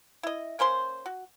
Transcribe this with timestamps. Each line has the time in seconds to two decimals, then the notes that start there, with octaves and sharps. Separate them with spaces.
0.23 E4 D#5
0.59 A#3 C#4 C5 C6
1.06 F#4